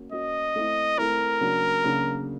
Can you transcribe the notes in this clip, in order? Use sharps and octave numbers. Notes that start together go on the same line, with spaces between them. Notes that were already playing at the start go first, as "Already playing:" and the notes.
Already playing: A#3 C#4 F#4
A#3 C#4 F#4 D#5
A3 C4 E4
A3 C4 E4 A#4
C#3 F#3 A#3 D4 F#4
C#3 F#3 A#3 D4 F#4